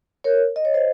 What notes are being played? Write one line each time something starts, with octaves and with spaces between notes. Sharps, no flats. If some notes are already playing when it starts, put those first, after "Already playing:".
A#4 C#5
D#5
C#5
C5 D#5